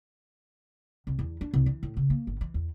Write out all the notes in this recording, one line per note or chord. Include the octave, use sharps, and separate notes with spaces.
C2
E2
D4
C2
E3
A2
C#3
A#3
G1
E3
E2